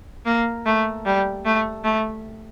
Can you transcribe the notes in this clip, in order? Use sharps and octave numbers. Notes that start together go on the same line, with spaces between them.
A#3
A3
G3
A3
A3